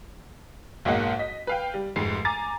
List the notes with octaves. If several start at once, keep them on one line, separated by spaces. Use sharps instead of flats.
B1 G#2 A#3 D#5 F#5
D#5 B6
B4 F5 G5
G3
F1 G#2 C7
G#5 A#5 D6 A6